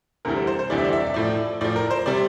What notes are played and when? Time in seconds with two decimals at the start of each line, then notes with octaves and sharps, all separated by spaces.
0.25 D2 C3 E3 G3 A#4
0.36 C5
0.47 C5
0.59 C5
0.70 D2 C3 E3 G3 D5
0.78 E5
0.84 D5
0.93 E5
1.00 D5
1.06 E5
1.14 A2 F3 D5
1.61 A2 F3 D5
1.76 A#4
1.91 C5
2.06 C3 G3 D5